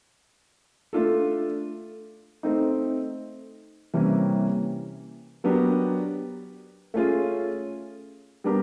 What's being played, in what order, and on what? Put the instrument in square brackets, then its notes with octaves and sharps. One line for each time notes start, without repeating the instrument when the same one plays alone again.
[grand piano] A3 D4 F4 A4
A3 C4 D#4
C3 E3 G3 A#3 C#4
F#3 B3 D4 G4 A#4
A3 C#4 F4 G#4
G3 B3 D4 G4 A#4